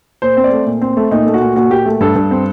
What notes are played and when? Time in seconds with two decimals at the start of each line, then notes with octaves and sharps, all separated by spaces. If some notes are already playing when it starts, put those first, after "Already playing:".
0.22 A#2 C5
0.37 C4
0.44 D5
0.52 A3
0.66 A#2
0.81 C4
0.97 A3
1.11 A#2 D#4
1.26 A3
1.34 F#4
1.41 A#2
1.56 A#2 F#4
1.70 A#2 G4
1.86 A3
2.01 G2 A4
2.15 G2
2.31 C4